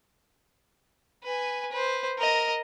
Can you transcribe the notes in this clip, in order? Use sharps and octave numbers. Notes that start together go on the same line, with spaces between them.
B4 G#5
B4 C5
A#4 D#5